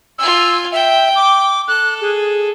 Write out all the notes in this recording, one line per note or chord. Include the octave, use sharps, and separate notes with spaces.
F4 G#5 E6
E5 G5
D6
A4 F#6
G#4